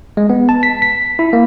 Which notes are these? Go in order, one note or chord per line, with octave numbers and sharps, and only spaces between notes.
G#3
B3
A5
B6
B6
E4
A#3